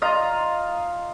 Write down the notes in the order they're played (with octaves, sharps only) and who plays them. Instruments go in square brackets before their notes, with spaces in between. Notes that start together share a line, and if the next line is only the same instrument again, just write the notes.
[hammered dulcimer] F4 D#5 A#5